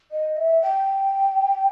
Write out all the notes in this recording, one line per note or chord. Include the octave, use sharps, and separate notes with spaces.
D#5
E5
G5